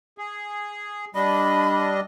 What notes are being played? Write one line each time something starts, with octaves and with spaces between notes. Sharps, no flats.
G#4
G3 D4 D#5 B5